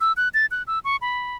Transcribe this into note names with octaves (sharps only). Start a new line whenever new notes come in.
E6
F#6
A6
F#6
E6
C#6
B5